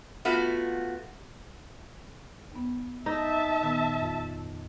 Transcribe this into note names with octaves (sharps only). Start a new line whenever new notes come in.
A3 B3 F4 F#4
D#2 B3
D#4 E5 A5
A#2 D#3 B3
F2